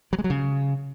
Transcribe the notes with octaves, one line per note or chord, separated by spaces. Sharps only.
F#3
G#3
F#3
C#3